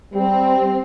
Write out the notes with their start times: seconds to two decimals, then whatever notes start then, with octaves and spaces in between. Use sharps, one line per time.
0.14 G3 C4